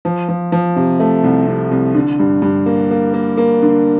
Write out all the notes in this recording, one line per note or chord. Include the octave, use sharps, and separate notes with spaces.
F3
F3
F3
C3
A3
C2
C3
C2
D3
G2
G2
A#3
A#3
A#3
A#3
D3